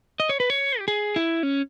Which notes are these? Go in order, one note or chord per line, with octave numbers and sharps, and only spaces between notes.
D#5
C#5
B4
C#5
G4
G#4
E4
C#4